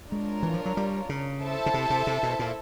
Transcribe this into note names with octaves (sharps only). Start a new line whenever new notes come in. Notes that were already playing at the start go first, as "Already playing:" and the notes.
G#3 D4 F4 A#4 C#5
E3
F3
F#3
G3
C#3
E4 A4 C5 E5 A5
C#3
C3
C3
C3
B2
A#2